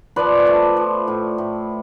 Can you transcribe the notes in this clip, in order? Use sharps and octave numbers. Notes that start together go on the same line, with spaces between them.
F3 B4 D5
A3
F3
A2
A2